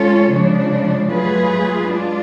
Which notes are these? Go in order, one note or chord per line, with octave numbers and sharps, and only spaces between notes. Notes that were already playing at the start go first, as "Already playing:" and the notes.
Already playing: G#3 C#4 F4 A4 C#5
C#3 F3 G#3 D4
F#3 A3 F4 G#4 B4
G#3 D4 F4